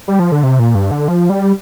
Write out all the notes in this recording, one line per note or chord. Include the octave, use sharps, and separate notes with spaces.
G3
F3
D3
C3
A#2
G2
D3
F3
G3